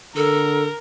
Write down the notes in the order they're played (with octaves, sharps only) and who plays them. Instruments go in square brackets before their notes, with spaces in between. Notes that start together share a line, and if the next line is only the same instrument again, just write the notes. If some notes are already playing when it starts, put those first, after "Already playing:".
[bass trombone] D3 [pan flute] A4 [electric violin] A#4